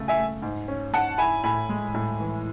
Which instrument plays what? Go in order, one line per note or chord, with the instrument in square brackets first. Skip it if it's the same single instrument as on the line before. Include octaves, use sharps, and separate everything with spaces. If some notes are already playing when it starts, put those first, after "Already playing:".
Already playing: [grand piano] C#3 A3
[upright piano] E5 G#5
[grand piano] A3
G#2
C#4
[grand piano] G#2 [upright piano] F#5 A5
[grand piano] E4 [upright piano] G#5 B5
[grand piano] A2 [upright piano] G#5 B5
[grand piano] G#3
A2
E3